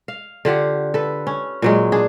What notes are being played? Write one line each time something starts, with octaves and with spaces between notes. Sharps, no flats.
F5
D3 F4 G4 F#5
A4 B4
C#4
A#2 F#3 G#3
D4 G#4